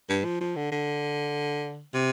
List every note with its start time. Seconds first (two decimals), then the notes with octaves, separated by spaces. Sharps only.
0.09 G2
0.24 F3
0.41 F3
0.56 D3
0.72 D3
1.94 C3